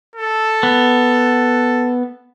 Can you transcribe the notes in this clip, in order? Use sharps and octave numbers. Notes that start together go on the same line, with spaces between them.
A4
B3